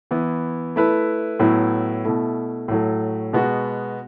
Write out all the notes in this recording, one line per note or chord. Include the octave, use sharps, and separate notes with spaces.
E3 B3 E4
A3 E4 B4
A2 F#3 B3 E4
B2 A3 E4
A2 F#3 A3
B2 G#3 B3 F#4